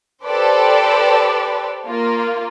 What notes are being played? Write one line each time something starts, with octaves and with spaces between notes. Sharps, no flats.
G4 A4 B4 C5 D5
A#3 F4